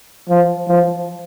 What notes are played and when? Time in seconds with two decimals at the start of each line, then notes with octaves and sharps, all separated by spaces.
0.29 F3
0.68 F3